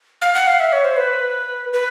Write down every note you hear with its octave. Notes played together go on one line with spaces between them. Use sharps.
F5
F#5
F5
E5
C#5
C5
B4
B4